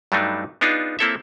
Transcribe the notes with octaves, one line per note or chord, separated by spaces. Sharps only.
G2 F#3 G3 A3 D4 D#4
B3 D4 D#4 F4 G#4
A#3 C4 E4 A4 C#5 E5